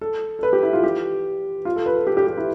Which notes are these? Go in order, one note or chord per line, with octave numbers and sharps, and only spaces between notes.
A4
A4
B4
G4
E4
F4
G4
F4
A4
B4
A4
G4
G4
G4
E4